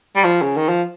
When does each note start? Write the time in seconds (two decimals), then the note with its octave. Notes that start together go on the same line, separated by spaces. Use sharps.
0.16 G3
0.24 F3
0.42 C#3
0.57 D#3
0.69 F3